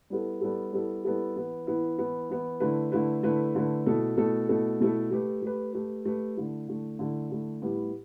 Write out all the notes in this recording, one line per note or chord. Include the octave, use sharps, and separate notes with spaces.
G3 B3 E4 A4
G3 B3 E4 A4
G3 B3 E4 A4
G3 B3 E4 A4
E3 B3 E4
E3 B3 E4
E3 B3 E4
E3 B3 E4
D3 A3 E4 B4
D3 A3 E4 B4
D3 A3 E4 B4
D3 A3 E4 B4
B2 A3 E4 A4
B2 A3 E4 A4
B2 A3 E4 A4
B2 A3 E4 A4
A3 G4 B4
A3 G4 B4
A3 G4 B4
A3 G4 B4
D3 A3 E4
D3 A3 E4
D3 A3 E4
D3 A3 E4
A2 G3 B3 E4 G4